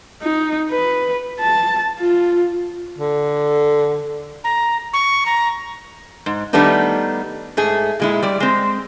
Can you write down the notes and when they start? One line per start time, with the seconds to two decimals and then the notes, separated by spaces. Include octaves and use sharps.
0.23 D#4
0.71 B4
1.40 A5
2.00 F4
2.98 D3
4.44 A#5
4.93 C#6
5.26 A#5
6.26 G#2
6.53 D#3 G3 A3 B3 D4 D#4
7.57 G#2 A3 G#4
8.00 A#2 G#3 E4
8.23 G3 D5
8.40 G#3 C4